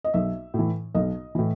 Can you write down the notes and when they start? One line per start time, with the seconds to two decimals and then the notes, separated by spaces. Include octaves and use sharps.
0.04 D#5
0.14 B1 E5
0.54 A2
0.59 E3
0.95 B1 D#5
1.35 A2 E3